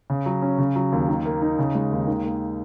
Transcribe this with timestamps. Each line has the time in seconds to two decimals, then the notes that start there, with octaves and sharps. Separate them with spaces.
0.10 C#3
0.26 F#3
0.42 C#4
0.58 C#3
0.76 F#3
0.92 D#2
1.08 D#3
1.25 A#3
1.42 D#4
1.59 C#3
1.75 G#3
1.91 D#2
2.07 D#3
2.24 A#3